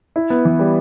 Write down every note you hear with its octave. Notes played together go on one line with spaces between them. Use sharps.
E4
B3
E3
G3